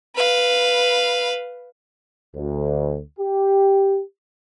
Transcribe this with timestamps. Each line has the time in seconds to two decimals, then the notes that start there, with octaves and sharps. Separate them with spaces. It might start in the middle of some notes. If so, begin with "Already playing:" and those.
0.16 B4 F5
2.36 D2
3.20 G4